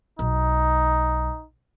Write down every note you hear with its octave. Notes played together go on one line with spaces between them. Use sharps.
B1 D#4